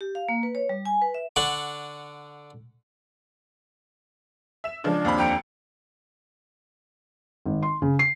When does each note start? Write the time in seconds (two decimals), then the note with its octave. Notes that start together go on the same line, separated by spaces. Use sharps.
0.01 G4
0.15 F5
0.29 A#3
0.43 B4
0.55 C#5
0.69 G3
0.85 G#5
1.02 B4
1.14 E5
1.36 D3 D4 F#5 C#6
4.64 E5 E7
4.84 C#3 F3 G#3 D4
5.05 D#2 C4 B5
5.18 F2 G5 A#5 C#7
7.46 G#1
7.63 C6
7.82 C#3
7.99 C7